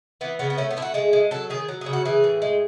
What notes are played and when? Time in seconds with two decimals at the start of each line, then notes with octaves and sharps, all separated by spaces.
0.21 E3 B3
0.39 C#3 B3
0.50 B3
0.58 A3 C#4
0.71 B3
0.77 A3 E4
0.82 F#4
0.94 G#3 G#4
1.13 G#3
1.31 F#3 A4
1.50 D#3 G#4
1.69 F#3
1.81 G#4
1.86 C#3
1.93 F#4
2.05 E3 G#4
2.24 A2
2.42 G#3